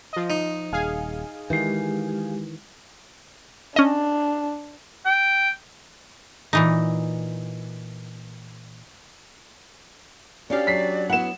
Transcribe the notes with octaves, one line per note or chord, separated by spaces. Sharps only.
F3 D#5
D#4
D#1 G#4 F5 G#5
D#3 E3 G#3 G4
C#4 D4 D#5
G5
A#2 E3 D#4
B2 C#4 D4 G4 D5 F5
F#3 B6 C7
B3 E4 F#5 E7